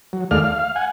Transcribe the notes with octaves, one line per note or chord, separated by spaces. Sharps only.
F#3
D#2 G#3 A3 D5 F5 F6
F5
F5
F#5 G#5